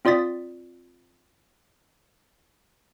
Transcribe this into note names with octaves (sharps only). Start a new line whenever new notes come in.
C4 F4 D5 D#6 A6 B6